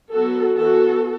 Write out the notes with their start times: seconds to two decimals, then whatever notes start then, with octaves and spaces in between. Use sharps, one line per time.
0.13 F#3 B3 F#4 A4
0.56 E3 B3 F#4 A4